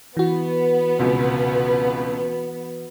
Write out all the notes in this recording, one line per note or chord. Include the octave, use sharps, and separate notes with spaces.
E3 B3 F#4
F1 C#2 B2